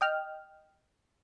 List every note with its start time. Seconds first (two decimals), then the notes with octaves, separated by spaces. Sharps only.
0.01 D#5 G5 F6